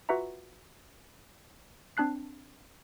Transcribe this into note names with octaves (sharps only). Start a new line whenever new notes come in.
F4 F#4 B4 E5 F#5 A#5
C4 D4 A5 F#6 C7